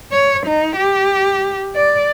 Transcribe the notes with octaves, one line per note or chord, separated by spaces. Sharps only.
C#5
D#4
G4
D5